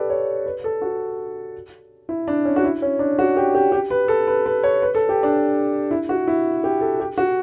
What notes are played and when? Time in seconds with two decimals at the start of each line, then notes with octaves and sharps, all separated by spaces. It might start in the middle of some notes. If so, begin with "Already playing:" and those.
Already playing: G4 A4 B4 D5
0.10 C#5
0.46 B4
0.64 A4
0.82 F#4
2.09 E4
2.28 D4
2.45 C#4
2.56 F#4
2.64 E4
2.82 C#4
2.99 D4
3.19 F#4
3.37 G4
3.55 G4
3.72 G4
3.90 B4
4.08 A4
4.27 B4
4.46 B4
4.63 C#5
4.82 B4
4.95 A4
5.09 G4
5.23 D4
5.91 E4
6.09 F#4
6.27 E4
6.64 G4
6.81 A4
7.00 G4
7.18 F#4